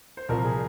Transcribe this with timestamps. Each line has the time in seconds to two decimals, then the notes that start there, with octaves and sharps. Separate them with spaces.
0.17 C5
0.29 C2 A#2 F3 A#4
0.45 G#4